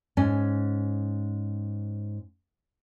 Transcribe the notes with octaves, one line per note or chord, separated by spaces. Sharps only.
G#2 C#4 G#5